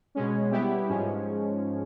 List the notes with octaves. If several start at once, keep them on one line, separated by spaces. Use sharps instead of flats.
B2 G#3 C#4
G3 B3 E4 G4
G#2 F3 G#3 C#4